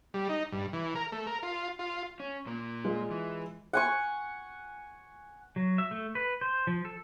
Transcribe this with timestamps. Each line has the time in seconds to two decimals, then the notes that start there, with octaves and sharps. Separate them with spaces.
0.14 G3
0.29 D#4
0.52 G2
0.73 E3
0.95 A#4
1.12 A3
1.27 A#4
1.43 F4
1.79 F4
2.20 C#4
2.46 A#2 A#3
2.85 G#3 F4
3.11 E3
3.73 F#5 G#5 C#6
5.56 F#3
5.78 E5
5.91 A3
6.15 B4
6.41 C5
6.67 F3
6.85 A4